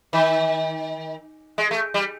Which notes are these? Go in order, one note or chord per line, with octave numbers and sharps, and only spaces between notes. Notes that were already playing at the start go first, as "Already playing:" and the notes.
D#3
G#3
A3
G3